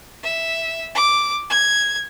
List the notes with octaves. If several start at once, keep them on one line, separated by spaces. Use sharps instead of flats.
E5
D6
G#6